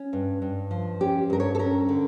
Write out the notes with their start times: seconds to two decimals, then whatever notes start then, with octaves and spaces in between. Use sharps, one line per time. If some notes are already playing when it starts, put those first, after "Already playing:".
Already playing: C#4
0.13 G2
0.42 G2
0.71 F3
1.01 C#4 G4
1.30 G2 A#4
1.40 C#5
1.55 A4
1.59 C#4 A#4
1.89 D3